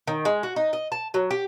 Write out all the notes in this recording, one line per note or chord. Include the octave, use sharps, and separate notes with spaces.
D#3
G#3
F#4
D#4
D#5
A5
F#3
G4